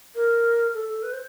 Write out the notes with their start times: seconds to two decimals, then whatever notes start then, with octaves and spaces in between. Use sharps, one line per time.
0.16 A#4
0.74 A4
0.89 A4
1.03 B4
1.13 C5